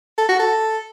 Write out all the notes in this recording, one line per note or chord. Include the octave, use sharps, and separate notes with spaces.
A4
F#4
A4